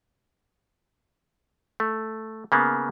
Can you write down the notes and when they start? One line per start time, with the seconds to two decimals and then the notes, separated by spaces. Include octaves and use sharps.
1.80 A3
2.52 C#3 A#3 B3